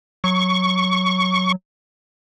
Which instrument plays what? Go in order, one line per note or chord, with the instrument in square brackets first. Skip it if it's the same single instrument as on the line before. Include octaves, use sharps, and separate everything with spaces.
[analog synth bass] F#3 [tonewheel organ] C#6